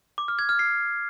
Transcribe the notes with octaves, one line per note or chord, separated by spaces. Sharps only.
D6
F6
G#6
F6
C7